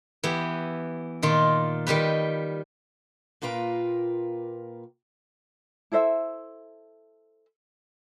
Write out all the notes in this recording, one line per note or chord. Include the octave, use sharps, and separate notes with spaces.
E3 B3 G4
A#2 D#3 F4
D#3 G3 G4 B4
A#2 A#3 F4 B4 G5
E4 A4 C5 E5